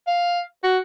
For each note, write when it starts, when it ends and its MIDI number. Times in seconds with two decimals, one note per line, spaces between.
0.07 0.41 77
0.63 0.78 66